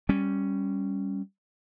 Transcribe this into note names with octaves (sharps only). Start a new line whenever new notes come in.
G3 C#4